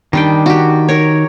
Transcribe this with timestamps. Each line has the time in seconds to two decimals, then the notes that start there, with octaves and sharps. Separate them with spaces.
0.13 D#3 G3 D4 G5
0.46 F#4 G4
0.88 A#4 C#5